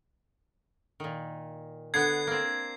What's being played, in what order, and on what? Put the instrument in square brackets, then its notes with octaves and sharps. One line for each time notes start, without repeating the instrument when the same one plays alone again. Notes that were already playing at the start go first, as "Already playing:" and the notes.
[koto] A#2 D#3
[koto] D3 B3 D4 [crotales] G#6 C7
[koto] A#3 C4